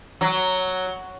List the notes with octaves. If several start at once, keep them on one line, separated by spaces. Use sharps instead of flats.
F#3